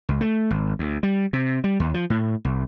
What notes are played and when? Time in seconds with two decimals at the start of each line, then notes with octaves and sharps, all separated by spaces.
0.09 C#2
0.21 A3
0.50 G#1
0.79 D2
1.03 G3
1.33 C3
1.64 G3
1.80 D#2
1.94 F3
2.10 A2
2.45 C2